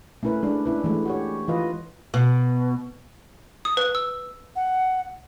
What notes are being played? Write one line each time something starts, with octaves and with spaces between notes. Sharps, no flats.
A3 C#4 E4 A#4 B4
G#3 D4
C#4 E4 B4
E3 G#3 A3
F#4 G4 C#5
E3 F4 B4 D#5
B2
D#6
B4
E6
F#5